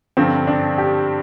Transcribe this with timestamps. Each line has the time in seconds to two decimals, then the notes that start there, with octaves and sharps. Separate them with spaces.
0.17 G2 D3 F3 C4
0.47 D4
0.78 G4